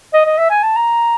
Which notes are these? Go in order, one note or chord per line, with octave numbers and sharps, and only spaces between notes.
D#5
D#5
E5
G#5
A5
A#5